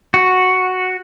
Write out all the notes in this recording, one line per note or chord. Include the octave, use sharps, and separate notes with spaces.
F#4